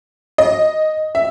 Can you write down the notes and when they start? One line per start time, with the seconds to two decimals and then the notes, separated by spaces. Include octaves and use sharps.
0.38 D#5
1.15 E5